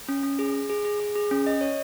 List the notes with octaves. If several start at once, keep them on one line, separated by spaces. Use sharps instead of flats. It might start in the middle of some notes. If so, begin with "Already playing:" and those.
C#4
C#4
G#4
G#4
G#4
G#4
G#4
G#4
C#4
D#5
C#5